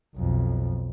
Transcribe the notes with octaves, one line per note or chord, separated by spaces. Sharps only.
B1 F2